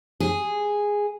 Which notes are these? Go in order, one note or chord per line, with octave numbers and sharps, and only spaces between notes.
G#4